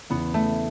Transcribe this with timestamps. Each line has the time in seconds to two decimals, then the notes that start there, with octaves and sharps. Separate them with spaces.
0.10 E2 C#3 E3 B3
0.34 A3